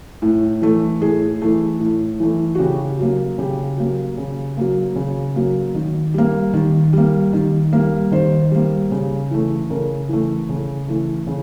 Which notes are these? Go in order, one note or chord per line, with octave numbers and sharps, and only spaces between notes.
A2
E3 A3
A2 G#4
E3 A3
A2
E3 A3
F#4
C#3 G4
F#3 A#3
C#3 G4
F#3 A#3
C#3
F#3 A#3
C#3
F#3 A#3
D#3
G3 A#3
D#3
G3 A#3
D#3
G3 A#3
D#3 C5
G3 A#3
C#3
E3 A3
C#3 A#4
E3 A3
C#3
E3 A3
C#3